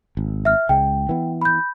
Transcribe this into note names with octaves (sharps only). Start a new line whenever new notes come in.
G#1
E5 F6
C#2 G#3 G5
E3 B3
B5 G6